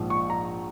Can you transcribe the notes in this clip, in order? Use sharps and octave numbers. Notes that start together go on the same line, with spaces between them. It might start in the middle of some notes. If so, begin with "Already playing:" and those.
Already playing: A#1 G#2 F3
C#6
A#5